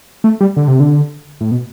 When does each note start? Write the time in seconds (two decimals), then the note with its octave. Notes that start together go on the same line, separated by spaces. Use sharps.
0.24 A3
0.41 G3
0.57 D3
0.68 C3
0.80 D3
1.41 A2
1.51 B2